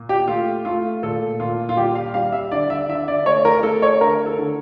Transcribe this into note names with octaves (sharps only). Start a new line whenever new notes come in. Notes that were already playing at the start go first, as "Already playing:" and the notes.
Already playing: A#2
G4
A3 F4
A3 F4
A#2 A4
A#2 F4
F4
G3 G4
F5
G3 F5
E5
D3 D5
E5
D3 E5
D5
A3 C#5
A#4
A3 A4
C#5
D3 A#4
A4
D3